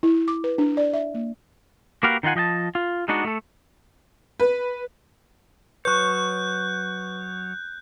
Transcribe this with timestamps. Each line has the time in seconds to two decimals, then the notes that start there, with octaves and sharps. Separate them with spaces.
0.03 E4
0.28 D6
0.44 B4
0.58 D4
0.77 D5
0.93 E5
1.14 A#3
2.03 A#3 F#4 G4 A#4 B4 F5
2.23 D#3 D#4 F4 F#5 G#5
2.35 F3 D#5 G5 A5
2.75 F4
3.08 G#3 B3 D4 D#4 F#4
3.25 A3 A4
4.40 B4
5.85 F#3 B4 C#5 C#6 F#6 G6